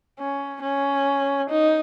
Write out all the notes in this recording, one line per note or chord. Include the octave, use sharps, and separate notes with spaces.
C#4
C#4
D#4